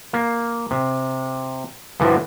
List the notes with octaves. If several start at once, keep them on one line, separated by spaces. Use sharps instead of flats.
A#3
C3
G2 D3 E3 F3 F#4